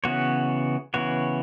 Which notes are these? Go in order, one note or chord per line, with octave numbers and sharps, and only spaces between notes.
C#3 E3 B3 F#4 C#5
C#3 E3 B3 F#4 C#5